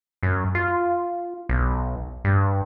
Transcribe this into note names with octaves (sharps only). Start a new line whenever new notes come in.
F#2
F4
B1
G2